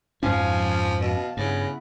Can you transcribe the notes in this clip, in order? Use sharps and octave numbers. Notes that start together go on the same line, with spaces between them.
F2 G#2 F3 C#4 F5 G#5
B2 F5 A5
G2 C#3 B3 E4